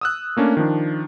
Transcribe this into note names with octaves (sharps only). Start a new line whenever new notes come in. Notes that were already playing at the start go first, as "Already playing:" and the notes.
D#6 E6 F#6
A3 A#3 C#4 D4
D#3 F3 D4